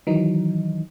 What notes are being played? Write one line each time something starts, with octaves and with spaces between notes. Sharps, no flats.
D#3 E3 F#3 D#4